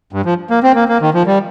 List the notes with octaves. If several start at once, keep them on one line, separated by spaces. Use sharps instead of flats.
G2
F3
A#3
C4
A#3
A#3
D#3
F3
G3